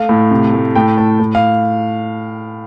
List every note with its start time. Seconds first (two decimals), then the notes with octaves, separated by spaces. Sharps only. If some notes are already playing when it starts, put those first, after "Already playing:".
Already playing: A3 F5
0.09 A2
0.31 C3
0.53 A3
0.75 A2 G5
0.98 A2 A5
1.20 A2
1.35 F5